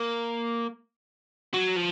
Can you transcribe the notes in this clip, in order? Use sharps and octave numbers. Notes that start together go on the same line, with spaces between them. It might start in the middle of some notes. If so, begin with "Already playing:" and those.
Already playing: A#3
F#3
F3